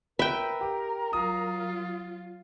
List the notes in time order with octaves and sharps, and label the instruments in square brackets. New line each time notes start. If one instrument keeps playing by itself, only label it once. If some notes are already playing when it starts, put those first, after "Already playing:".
[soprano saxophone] A#4 [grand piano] B4 [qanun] E5 G5
[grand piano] G4
[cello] F#3 F4 [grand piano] D#6